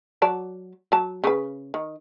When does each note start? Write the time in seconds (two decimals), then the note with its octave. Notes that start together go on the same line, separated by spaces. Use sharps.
0.22 F#3 D5 A5
0.92 F#3 A5
1.24 C#3 B4
1.74 D#3